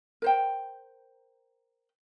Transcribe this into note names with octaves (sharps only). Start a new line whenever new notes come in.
A#4 C5 G5